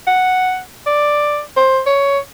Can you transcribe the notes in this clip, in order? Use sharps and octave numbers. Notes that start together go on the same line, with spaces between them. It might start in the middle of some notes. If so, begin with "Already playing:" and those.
F#5
D5
C5
C#5